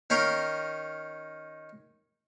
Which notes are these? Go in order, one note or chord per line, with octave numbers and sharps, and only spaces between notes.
D#3 C#4 A#4 F5 G5